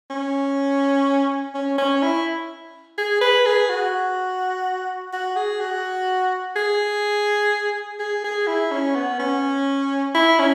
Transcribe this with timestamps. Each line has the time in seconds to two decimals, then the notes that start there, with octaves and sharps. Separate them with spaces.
0.10 C#4
1.54 C#4
1.78 C#4
2.02 E4
2.98 G#4
3.21 B4
3.46 G#4
3.69 F#4
5.13 F#4
5.36 G#4
5.60 F#4
6.56 G#4
7.99 G#4
8.24 G#4
8.47 E4
8.71 C#4
8.96 B3
9.20 C#4
10.15 E4
10.39 C#4